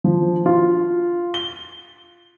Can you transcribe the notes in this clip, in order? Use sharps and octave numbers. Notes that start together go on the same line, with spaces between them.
F3
F4
G7